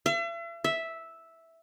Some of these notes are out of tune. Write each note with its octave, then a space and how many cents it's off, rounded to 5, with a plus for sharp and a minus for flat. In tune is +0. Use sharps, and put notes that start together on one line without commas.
E5 +40
E5 -5